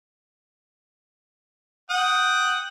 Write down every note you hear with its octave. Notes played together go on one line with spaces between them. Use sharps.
F#5 G5 D#6